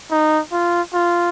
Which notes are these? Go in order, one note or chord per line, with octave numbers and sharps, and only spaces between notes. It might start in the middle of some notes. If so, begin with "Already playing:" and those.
D#4
F4
F4